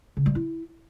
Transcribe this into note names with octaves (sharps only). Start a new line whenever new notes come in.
C#3
G3
E4